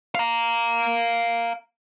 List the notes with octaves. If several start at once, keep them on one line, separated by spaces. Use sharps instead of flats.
F5 A#5